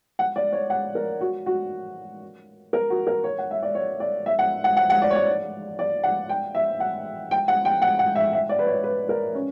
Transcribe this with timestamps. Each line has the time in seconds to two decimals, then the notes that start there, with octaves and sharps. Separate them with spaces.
0.19 F#5
0.36 D5
0.53 C#5
0.70 F#5
0.95 A#4
1.21 F#4
1.46 F#4
2.73 A#4
2.90 F#4
3.07 A#4
3.24 C#5
3.38 F#5
3.51 E5
3.63 D5
3.75 C#5
4.00 D5
4.26 E5
4.39 F#5
4.64 F#5
4.77 F#5
4.90 F#5
5.02 D5
5.11 C#5
5.15 D5
5.79 D5
6.03 F#5
6.29 G5
6.55 E5
6.80 F#5
7.31 G5
7.48 F#5
7.65 G5
7.82 F#5
7.99 F#5
8.15 E5
8.33 E5
8.49 D5
8.59 B4
8.67 C#5
8.84 B4
9.09 A#4
9.35 C#4